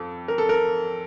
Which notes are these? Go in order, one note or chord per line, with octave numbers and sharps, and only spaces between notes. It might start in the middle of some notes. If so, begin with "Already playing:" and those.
Already playing: F2 A4
A#4
A4
A#4